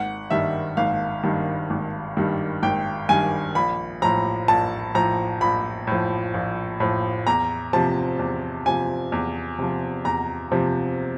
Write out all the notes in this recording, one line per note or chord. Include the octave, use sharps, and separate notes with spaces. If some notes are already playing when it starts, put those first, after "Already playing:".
Already playing: G#1 F#5
G2 D#3 G3 E5
G#1 F5
G2 D#3 G3
G#1
G2 D#3 G3
G#1 G5
G2 D#3 G3 G#5
A#1 B5
A2 F3 A#5
A#1 A5
A2 F3 A#5
A#1 B5
A2 F3
A#1
A2 F3
E2 A#5
C3 F3 A5
E2
C3 F3 G#5
E2
C3 F3
E2 A#5
C3 F3